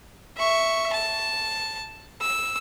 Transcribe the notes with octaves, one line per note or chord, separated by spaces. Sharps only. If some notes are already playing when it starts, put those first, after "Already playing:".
E5 C#6
A5
E6